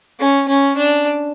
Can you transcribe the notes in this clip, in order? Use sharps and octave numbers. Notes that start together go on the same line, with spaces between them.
C#4
C#4
D4